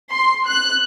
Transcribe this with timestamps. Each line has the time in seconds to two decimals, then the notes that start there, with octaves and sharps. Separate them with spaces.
0.11 C6
0.47 F#6